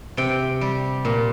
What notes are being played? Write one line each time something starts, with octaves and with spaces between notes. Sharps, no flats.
C3 G5
G3
A#2